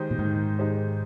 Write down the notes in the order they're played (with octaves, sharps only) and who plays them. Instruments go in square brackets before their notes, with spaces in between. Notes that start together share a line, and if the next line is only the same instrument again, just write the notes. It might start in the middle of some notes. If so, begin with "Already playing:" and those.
Already playing: [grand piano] D#3 G#3 D#4 G4 C5
[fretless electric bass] A#2
[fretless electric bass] G#2 [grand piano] D#3
[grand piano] G#3 D#4 G4 C5